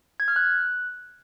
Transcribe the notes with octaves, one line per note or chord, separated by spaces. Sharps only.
G#6
F6
F#6